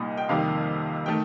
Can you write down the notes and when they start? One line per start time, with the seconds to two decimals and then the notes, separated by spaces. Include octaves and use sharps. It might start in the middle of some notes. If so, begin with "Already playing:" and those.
Already playing: C2 A#2 G3 A#3 D#4 D#5
0.17 G5
0.29 F2 C3 D#3 G3 A#3 F5
1.06 D#3 A3 G5